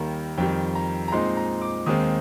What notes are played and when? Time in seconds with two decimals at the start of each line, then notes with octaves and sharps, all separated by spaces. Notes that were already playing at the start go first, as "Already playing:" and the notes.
Already playing: D#2 D#3 G3 A#3
0.38 F2 D#3 G3 G5
0.75 A#5
1.08 A#5
1.12 A#2 G#3 C4 D#4 C6
1.37 A#5
1.61 D6
1.86 D#2 D#3 G#3 C4 D#6